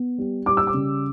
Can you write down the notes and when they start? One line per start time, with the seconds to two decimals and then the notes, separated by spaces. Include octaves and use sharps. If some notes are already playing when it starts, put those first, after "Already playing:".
Already playing: B3
0.18 G3
0.46 G3 D6
0.57 E6
0.67 D6
0.74 C#3